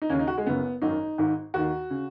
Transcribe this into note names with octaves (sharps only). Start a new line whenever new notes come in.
D#4
D#2 C#3 C#4
D#4
F#4
G#3
F#1 F#2 C#3 B3
G#1 F#2 D#3 D#4
G#1 G#2 D#3
D#2 D#3 F#4
C#3